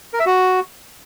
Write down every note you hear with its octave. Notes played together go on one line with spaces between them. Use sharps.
A#4
E5
F#4